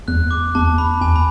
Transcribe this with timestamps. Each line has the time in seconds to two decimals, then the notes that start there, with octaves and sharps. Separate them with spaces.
0.08 E2 F#6
0.31 D6
0.55 E2 A5
0.78 B5
1.01 E2 G#5
1.16 B5